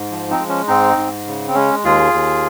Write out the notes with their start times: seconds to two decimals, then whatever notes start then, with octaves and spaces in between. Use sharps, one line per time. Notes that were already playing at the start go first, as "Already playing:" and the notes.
Already playing: G#2
0.11 F3
0.30 C4 D#4
0.39 G#3
0.49 C#4
0.68 G#2 C4 D#4
0.97 G#2
1.27 C#3
1.48 C4
1.55 G#3 C#4
1.84 D#2 F4 G#4
2.13 D#2